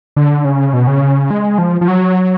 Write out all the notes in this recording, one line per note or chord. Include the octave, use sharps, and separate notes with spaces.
D3
C#3
B2
C#3
G#3
F3
F3
F#3